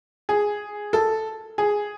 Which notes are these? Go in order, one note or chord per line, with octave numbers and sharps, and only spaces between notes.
G#4
A4
G#4